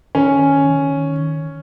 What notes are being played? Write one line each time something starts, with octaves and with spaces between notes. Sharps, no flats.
D#3 C#4
D#3